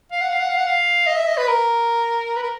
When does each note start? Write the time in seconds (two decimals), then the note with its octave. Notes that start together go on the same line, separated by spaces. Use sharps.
0.12 F5
0.21 F#5
0.30 F5
0.40 F#5
0.49 F5
0.57 F#5
0.67 F5
1.07 D#5
1.17 E5
1.28 D#5
1.37 B4
1.48 A#4
2.37 B4
2.43 A#4